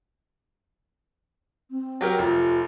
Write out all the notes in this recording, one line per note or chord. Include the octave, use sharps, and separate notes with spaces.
C4
F#3 G4 A#4
F1 F4